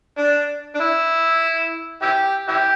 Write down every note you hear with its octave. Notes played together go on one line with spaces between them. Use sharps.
D4
D4
E4
E4 G4
E4 G4